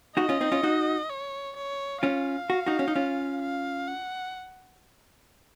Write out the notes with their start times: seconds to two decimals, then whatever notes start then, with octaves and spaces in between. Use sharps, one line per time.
0.17 D#4 F#4 D#5
0.29 C#4 F4
0.41 C4 D#4
0.52 C#4 F4
0.63 D#4 F#4
1.10 C#5
1.56 C#5
2.03 C#4 F4 F5
2.50 F#4
2.67 D#4 F#4
2.79 C#4
2.88 D#4
2.96 C#4 F4
3.42 F5
3.88 F#5